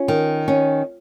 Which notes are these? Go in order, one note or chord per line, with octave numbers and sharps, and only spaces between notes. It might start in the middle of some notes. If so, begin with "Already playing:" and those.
Already playing: C#4 F4
D#3
C#4